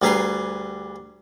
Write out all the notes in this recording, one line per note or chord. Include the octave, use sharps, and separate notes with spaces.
D2 G3 G#4 B4 A#5 C6